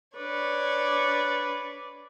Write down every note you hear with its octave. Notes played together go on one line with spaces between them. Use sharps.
D4 B4 C#5 D5